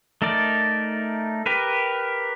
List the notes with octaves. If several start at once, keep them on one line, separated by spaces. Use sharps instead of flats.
A3 D#4 A#4 D5
G4 A#4 B4